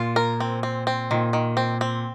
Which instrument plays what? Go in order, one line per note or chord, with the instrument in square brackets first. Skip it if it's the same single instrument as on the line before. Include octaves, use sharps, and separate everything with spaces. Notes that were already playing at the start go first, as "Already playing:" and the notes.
Already playing: [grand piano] A#2 [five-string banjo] F4
[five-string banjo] A#4
C4
C4
C4
[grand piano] A#2 [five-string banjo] D#3
[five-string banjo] D#3
C4
C4